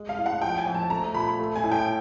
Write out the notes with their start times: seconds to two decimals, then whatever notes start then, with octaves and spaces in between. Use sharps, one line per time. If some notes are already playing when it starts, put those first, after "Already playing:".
Already playing: G#3
0.09 F5
0.18 A2
0.26 F#5
0.42 F3 G5
0.58 G#5
0.66 F2
0.75 A5
0.90 A3 A#5
1.14 A#2 B5
1.39 A3
1.56 G#5
1.64 A2
1.72 G5